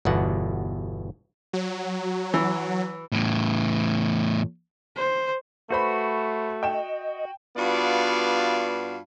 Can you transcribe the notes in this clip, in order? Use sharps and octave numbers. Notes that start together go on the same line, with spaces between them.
G1 E2 B2 F#5
F#3
E3
E2 A2
C5
A3 F#4 B4 C5 B5
D#5 G5 E7
G2 B3 F4 F#4 D5 F5